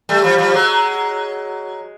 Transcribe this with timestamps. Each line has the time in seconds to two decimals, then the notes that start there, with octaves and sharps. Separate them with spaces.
0.09 G3 A3
0.24 F3 G3
0.38 F3 G3
0.54 F#3 G#3